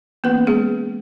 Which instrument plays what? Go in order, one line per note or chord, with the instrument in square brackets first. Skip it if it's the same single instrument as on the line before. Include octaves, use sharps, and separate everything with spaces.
[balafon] E3 A#3 B3 C#4 B4
G#3 G#4